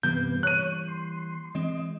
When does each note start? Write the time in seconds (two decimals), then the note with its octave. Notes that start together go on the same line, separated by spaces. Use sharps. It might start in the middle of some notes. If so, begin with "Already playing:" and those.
0.03 G2 C3 E3 G3 A#3 B3 G6
0.43 C#5 F#6 D#7
0.88 C6
1.55 E3 G#3 C4 D#5